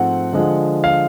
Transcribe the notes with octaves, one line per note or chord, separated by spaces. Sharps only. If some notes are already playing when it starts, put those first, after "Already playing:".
Already playing: G#2 F3 A3 C4 F#5
D3 F3 G#3
F5